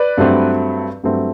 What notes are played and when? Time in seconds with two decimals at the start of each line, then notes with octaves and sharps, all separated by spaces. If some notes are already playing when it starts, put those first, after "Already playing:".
Already playing: B4 D5
0.18 G2 F#3 A3 C4
1.04 G2 F#3 A3 C4